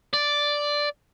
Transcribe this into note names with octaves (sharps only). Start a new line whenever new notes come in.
D5